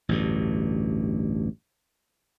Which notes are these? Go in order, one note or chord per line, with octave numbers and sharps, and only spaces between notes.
A1 D2 G2